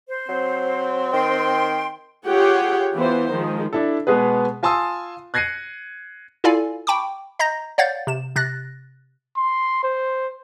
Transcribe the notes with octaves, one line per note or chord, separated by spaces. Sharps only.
C5
F#3 C4
D#3 G5 C6
F4 G4 G#4 C#5 F#5 G5
E3 B3 F4 C5
D#3 F3 G#3
D4 E4 A4
B2 G#3 B3 G#4 B4
F4 G#5 A5 C6 D#6 E6
F#6 G#6 A#6 C7 C#7 D#7
E4 F4 A4 D5 F5 G#5
G5 A5 B5 C#6 D6
D#5 A#5 G6 A#6
C#5 D5 F5 F#5 G6 A6
C3 E7
C3 F#6 A6 A#6
C6
C5